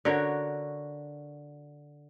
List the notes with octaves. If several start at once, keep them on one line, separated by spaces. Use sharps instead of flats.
D3 F#4 A#4 C#5